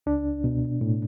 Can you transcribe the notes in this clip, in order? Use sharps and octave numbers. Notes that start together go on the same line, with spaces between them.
C#2 D4
B2
A2